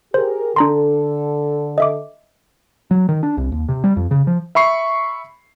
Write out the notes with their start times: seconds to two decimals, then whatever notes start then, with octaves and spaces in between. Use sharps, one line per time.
0.14 G4 G#4 A#4 C5
0.56 D3 D4 A4 A#5 C6
1.78 D#5 E5 D6
2.91 F#3
3.09 D#3
3.23 D4
3.37 C2
3.52 D#2
3.69 C3
3.84 G3
3.97 F2
4.11 C#3
4.27 F3
4.55 E5 B5 C#6 C7